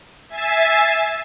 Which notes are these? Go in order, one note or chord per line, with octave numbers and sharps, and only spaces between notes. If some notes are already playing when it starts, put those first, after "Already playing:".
E5 G#5 E6 A6 C7